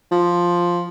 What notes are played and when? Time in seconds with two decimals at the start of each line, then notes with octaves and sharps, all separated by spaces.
0.11 F3